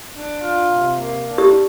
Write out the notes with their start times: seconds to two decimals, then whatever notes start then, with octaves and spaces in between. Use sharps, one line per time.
0.13 D4
0.41 F4
0.69 C3
0.97 A#3
1.24 D4
1.38 G4